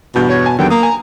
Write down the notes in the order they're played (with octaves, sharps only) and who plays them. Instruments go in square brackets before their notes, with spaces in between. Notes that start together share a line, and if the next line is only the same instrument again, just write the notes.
[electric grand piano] E2 G2 G6 [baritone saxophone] B2
[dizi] C#5
[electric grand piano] G#5 A5
[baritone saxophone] D#2 [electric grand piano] D3 F#3 B3 [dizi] G5
[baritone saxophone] A#3 [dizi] A#5 [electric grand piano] D#6
[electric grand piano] G#5